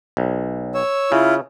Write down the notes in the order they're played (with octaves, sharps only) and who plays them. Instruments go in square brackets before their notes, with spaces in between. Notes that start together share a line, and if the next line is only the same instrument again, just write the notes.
[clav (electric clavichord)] B1
[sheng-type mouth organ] C#5 E6
[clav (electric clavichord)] C#3 [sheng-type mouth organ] E4 F4